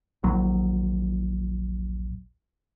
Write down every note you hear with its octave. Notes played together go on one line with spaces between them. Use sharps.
D#1 A#1 F#3